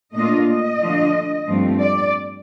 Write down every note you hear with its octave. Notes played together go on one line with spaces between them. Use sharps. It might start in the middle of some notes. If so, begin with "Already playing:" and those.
A#2 A3 D4 F4 D#5
D#5
D3 F3 A3 D4 F4
G2 F3 A3 C4
D5